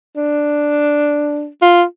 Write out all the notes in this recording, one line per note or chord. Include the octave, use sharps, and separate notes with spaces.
D4
F4